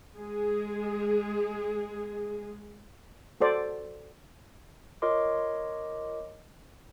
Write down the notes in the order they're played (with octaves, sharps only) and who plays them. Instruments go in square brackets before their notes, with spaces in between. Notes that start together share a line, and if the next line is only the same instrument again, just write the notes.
[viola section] G#3 G#4
[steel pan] F#4 A4 C5 D5
[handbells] F4 A#4 C#5 D#5 C6 D6